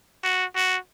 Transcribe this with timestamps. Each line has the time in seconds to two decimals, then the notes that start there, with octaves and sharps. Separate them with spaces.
0.24 F#4
0.55 F#4